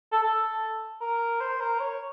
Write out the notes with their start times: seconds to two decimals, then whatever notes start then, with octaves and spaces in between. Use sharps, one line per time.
0.12 A4
0.22 A4
1.01 A#4
1.40 C5
1.60 A#4
1.79 C#5